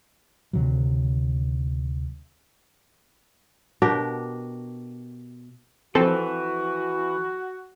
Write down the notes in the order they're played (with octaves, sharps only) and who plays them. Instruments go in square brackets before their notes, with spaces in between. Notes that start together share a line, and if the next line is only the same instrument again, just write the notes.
[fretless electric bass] D2 C3 D#3 F#3
[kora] B2 D4 G4 A#4
[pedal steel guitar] E3 [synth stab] F3 C4 A4 [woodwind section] F#4